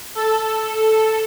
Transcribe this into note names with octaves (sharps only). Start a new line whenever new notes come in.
A4